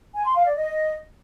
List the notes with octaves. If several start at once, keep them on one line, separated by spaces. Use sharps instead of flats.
G#5
C6
F5
D5
D#5